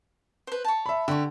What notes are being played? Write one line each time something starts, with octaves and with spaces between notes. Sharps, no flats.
B4 C5
C#5 A5
E5 B5
D3 G4 C#6